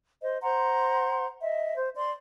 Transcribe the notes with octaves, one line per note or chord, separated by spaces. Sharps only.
C5 D#5
C5 F#5 A#5 C6
D#5 E5
C5
D5 C6